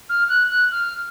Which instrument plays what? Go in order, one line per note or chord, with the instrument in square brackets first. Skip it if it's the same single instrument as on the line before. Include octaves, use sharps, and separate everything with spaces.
[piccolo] F6
F#6
F#6
F6